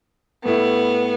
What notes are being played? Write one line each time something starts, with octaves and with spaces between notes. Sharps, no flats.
A2 A3 B3 E4